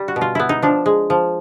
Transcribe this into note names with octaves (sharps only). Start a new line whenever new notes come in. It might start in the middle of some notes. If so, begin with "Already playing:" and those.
Already playing: G3
F#4
B2
F4
B3 E4
D#4
F3 D4
G#3
F3